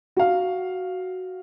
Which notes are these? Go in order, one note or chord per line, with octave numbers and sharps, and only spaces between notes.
F#4 F5